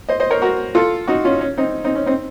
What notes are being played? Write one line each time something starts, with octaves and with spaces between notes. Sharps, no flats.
C5 D#5
C5 D#5
A#4 C#5
F#4 A#4
F4 A4
D#4 F#4
C#4 F4
C#4
C4 D#4
C4 D#4
C#4
C4 D#4